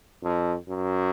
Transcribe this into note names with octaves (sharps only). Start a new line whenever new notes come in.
F2
F#2